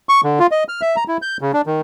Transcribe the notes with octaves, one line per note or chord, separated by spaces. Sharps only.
C#6
D3
F4
D#5
F6
E5
A#5
E4
G6
C#3
D4
D#3